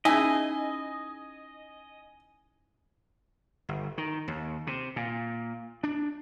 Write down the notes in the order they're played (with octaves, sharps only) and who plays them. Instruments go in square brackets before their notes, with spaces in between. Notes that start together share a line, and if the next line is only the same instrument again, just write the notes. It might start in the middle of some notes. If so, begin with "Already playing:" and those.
[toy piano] C#4 D#4 [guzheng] E4 G#4 [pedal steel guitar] D#5 [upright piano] G#5
[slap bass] G1
D#3
D#2
C3
A#2
D4